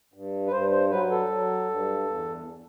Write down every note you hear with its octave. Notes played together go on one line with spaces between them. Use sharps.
G2
B4
G2 C5
C5
F#3 B4
A4
F#3
G2
E2